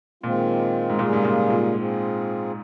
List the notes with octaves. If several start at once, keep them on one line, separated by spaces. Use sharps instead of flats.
A#2 D#3 G#3 C4 F4
G#2
A#2 C#3 G3 A#3 F4 G#4
G#2
A#2
A#2
C4 F4 G#4